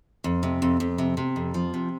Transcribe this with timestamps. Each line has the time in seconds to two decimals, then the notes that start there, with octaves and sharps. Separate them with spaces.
0.24 F2
0.43 C3
0.62 F2
0.80 F2
0.98 C3
1.17 C3
1.36 F2
1.54 F3
1.74 C3